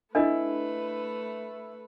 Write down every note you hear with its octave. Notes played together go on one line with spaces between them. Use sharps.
A3 D4 E4 A4 B4 D#5